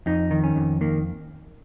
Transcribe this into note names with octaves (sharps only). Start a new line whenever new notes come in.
F2 D#4
D#3
C#4
F2
D#3 A#3